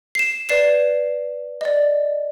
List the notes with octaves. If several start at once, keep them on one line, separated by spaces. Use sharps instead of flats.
C7 E7
B4 D5 C7 E7
D5 D#5